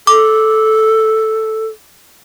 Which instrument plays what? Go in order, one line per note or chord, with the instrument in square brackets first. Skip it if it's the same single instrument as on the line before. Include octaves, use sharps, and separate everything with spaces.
[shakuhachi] A4 [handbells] D6